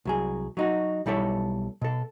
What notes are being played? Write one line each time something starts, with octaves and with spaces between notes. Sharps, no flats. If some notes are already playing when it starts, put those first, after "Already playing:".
C2 F#3 G#4
F#3 D#4 F#4
B1 G3 E4 A4 C#5
B2 A4